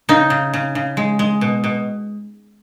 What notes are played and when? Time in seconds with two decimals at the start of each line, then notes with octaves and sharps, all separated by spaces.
0.09 C#3 D#4
0.30 C#3
0.54 C#3
0.75 C#3
0.97 G#3
1.19 G#3
1.41 B2
1.64 B2